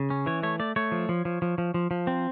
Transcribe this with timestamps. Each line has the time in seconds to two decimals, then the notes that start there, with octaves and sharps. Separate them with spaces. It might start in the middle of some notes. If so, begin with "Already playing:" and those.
Already playing: C#3
0.10 C#4
0.26 E3 C#5
0.43 A3 C#5
0.60 A3 D5
0.76 A3 C#5
0.92 F3
1.09 F3
1.25 F3
1.42 F3
1.58 F3
1.74 F3
1.91 F3
2.07 C4